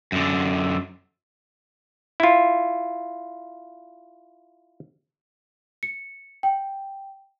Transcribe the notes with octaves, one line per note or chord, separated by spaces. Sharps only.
F#2 D3
E4 F4
C#7
G5